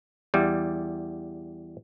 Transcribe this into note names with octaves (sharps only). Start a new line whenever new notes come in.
E2 G3